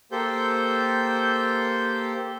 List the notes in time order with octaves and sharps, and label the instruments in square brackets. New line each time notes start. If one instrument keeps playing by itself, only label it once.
[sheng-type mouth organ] A#3 G4 A4 C5 G6